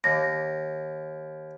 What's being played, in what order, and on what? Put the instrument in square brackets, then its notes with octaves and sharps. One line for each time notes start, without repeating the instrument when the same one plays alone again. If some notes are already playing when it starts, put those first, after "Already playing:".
[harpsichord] D#2 [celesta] A#6